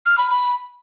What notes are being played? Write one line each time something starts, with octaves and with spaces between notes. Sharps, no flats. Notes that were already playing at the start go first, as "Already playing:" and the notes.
F6
B5
B5